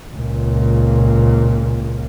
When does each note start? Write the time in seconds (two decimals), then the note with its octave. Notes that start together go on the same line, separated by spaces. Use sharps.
0.15 C#2 A#2